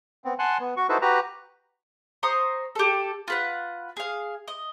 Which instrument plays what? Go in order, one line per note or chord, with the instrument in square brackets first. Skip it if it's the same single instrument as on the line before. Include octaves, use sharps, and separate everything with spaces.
[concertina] B3 C4
F#5 G#5 A5 C6 F#6
B3
F#4 C#6
D#4 E4 F#4 A4 B4 C5
F#4 G4 B4 A#5
[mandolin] C5 A#5 C#6 D#6
G4 A4
F4 B4 F#5
G#4 F5
D#5